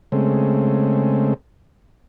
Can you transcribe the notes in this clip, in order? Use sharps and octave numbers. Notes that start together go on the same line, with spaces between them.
C#3 G#3 A3 C4